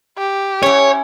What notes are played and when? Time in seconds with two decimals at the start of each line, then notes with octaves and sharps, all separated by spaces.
0.18 G4
0.63 C#4 E4 C#5